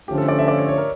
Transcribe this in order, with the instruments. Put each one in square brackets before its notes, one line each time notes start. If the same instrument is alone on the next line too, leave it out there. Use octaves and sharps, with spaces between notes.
[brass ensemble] D3 F3 A3 C#4 F4 [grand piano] G4
[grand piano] A4
D5
E5
D5
C#5
C#5
A#4